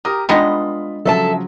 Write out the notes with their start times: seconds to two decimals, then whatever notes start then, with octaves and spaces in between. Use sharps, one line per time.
0.05 G4 A#4 A#5 D#6
0.29 G3 G#3 B3 D4 D#4 F4 D#5 B5
1.05 C#3 F3 F#3 A4 E5 A5